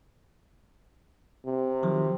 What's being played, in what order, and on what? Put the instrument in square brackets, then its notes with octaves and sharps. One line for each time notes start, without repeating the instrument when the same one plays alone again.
[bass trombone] C3
[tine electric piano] D#3 F3 F#3